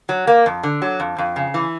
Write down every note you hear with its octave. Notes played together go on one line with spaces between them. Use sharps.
F#3
A#3
F2
D3
F#3
F2
F2
C#3
E3